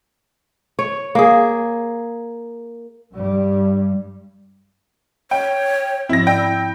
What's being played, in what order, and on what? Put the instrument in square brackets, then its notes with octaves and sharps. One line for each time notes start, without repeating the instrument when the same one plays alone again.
[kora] C#5
A#3 G#4
[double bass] G2 G3
[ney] C#5 [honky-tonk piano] G5
[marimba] G#2 F3 C4 [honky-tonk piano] E4 A#6
[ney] E4 [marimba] D5 E6 [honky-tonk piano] G5